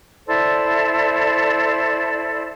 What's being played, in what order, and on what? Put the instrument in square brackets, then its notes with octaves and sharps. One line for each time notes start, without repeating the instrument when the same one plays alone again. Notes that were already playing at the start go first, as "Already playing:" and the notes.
[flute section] E4 A4 C5 D5